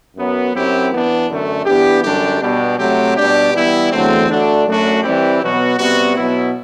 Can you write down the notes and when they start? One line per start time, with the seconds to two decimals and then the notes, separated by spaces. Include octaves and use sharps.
0.16 F#2 F#3 B3
0.53 F#2 F#3 C4 E4 G4
0.91 E3 B3 D4
1.29 F#2 D3 A3
1.66 E3 B3 D4 G4
2.03 F#2 D3 G3 D4 G4
2.41 B2 G3 B3 D4 G4
2.78 C3 F#3 A3 C4 G4
3.16 B2 G3 D4 G4
3.53 E3 G3 B3 E4
3.91 E2 D3 F#3 A3 C4
4.28 D3 A3 D4 F#4
4.66 F#2 F#3 A3 D4 F#4
5.03 E3 G3 C4 E4 G4
5.41 B2 F#3 B3 F#4
5.78 C3 G3 B3 F#4
6.15 B2 F#3 B3 E4